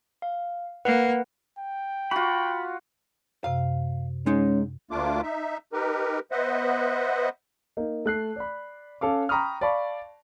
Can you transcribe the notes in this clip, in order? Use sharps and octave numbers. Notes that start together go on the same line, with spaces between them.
F5
A#3 B4 F#5
G5
F4 F#4 B5
F#2 C3 F5
G#3 C#4 D#4
D2 A3 A#3 D4 F4 D6
D#4 E5
D#4 G4 A#4 B4
B3 B4 C5 D#5 E5 F#5
A#3 D#4
A3 F#6 C7
D5 B5
C#4 A4 F5 D6
G5 A#5 B5 C#6 D#6 F6
D5 F5 A5 B5 C#6